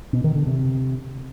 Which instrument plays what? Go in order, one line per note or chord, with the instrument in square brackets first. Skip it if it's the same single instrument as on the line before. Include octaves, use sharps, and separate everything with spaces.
[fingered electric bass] B2
D#3
D3
C3